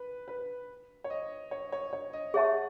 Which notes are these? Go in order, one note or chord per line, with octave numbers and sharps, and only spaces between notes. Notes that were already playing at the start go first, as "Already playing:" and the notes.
Already playing: B4
B4
C#5
D#5
C#5
C#5
C#5
D#5
G#4 C#5 E5 F#5 A5 C#6